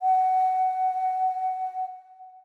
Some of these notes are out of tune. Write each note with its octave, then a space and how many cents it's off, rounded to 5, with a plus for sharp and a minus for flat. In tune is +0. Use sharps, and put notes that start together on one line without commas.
F#5 +15